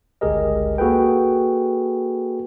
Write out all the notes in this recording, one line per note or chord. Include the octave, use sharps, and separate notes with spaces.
G1 C#2 G4 G#4 A#4 D#5
A#3 F#4 G#4 A4 B4 G5